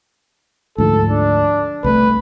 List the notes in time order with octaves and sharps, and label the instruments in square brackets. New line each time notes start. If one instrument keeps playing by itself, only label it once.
[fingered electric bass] D2 G#2 F3 [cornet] A4
[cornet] D4
[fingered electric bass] C2 G#3 A3 [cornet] B4